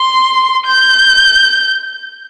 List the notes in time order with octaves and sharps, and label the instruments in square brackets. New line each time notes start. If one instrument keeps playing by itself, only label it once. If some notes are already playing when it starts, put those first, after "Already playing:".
Already playing: [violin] C6
G6